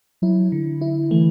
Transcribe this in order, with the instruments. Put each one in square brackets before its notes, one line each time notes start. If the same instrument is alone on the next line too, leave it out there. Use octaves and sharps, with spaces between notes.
[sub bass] F#3 [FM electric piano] E4
[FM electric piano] D3
E4
[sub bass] E3 [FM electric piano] A3